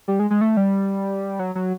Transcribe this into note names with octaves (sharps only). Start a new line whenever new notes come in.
G3
G#3
G#3
A3
G3
F#3
F#3